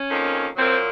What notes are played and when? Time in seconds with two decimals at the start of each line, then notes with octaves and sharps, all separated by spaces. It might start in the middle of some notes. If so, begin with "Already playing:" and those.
Already playing: C#4
0.10 F2 D#3 A#3
0.56 A#2 F#3 A#3 C4